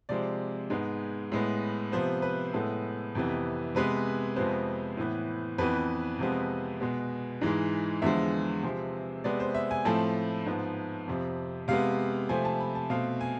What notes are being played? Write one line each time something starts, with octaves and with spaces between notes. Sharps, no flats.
C3 F3 G#3 C4 D5
G#2 G#3 B3
A2 G#3 B3
C3 F3 B3 C5
B4
A2 G#3 B3 A4
F2 C3 E3 B3
C3 G#3 B3 B4
F2 C3 F3 G#3 B3 C5
A2 E3 B3
F2 E3 B3 B4
F2 C3 F3 G#3 B3
B2 G#3 B3
G#2 E3 G#3
E2 D3 F3 G#3 E5
C3 F3 G#3 C4
C3 G#3 B3 D5
C5
E5
G#5
A2 F3 A3 C4 A5
G#2 F3 B3
F2 C3 F3
C3 G#3 B3 F5
C3 F3 A3 C4 G#5
A5
B5
A5
B2 A3 C4 F5
G#5